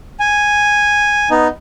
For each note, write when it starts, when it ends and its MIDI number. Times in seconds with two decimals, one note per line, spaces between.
0.20 1.29 80
1.30 1.48 59
1.30 1.48 63